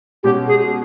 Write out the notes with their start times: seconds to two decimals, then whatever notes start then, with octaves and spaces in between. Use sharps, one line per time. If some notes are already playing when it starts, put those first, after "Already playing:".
0.23 B2 G#3 C#4 F#4 G4
0.48 G#4